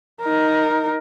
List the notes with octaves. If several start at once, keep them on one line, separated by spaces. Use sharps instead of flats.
D#4 A#4